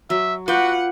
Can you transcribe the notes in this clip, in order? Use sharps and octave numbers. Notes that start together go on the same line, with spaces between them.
F#3 E5
F4 F#4 B4 F#5 G5 D6